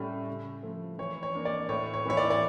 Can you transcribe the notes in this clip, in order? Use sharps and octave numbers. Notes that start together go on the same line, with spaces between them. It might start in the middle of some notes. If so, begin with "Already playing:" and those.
Already playing: A2 G3 C#4
C#3
F3 A3
E3 C#5
C#5
A#3 D4
D5
A2 C#5
C#5
E3 A#3 E4 C#5
D5
D5